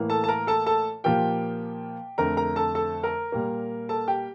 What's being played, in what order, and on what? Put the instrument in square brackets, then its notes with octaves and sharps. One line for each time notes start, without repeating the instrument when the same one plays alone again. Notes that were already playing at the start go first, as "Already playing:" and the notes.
Already playing: [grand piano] A2 E3 A#3
A4 A5
A5
A#4 A#5
A4 A5
A4 A5
A#2 F3 A#3 G4 G5
F2 D3 A3 A#4 A#5
A#4 A#5
A4 A5
A4 A5
A#4 A#5
A#2 G3 A#3
A4 A5
G4 G5